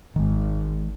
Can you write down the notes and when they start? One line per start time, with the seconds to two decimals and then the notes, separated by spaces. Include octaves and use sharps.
0.16 G#1 D#3 G#3